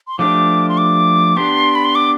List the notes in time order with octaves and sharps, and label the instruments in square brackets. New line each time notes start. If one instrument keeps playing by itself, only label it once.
[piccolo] C6
[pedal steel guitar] F3 A3 D4 G4 [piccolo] D6
[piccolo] C6
D6
[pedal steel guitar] B3 D4 G4 [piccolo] C6
[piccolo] B5
C6
D6